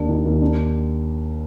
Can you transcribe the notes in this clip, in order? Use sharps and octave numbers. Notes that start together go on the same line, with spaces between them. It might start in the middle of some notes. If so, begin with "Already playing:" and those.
Already playing: D#2 D4
D#3
D#2
D4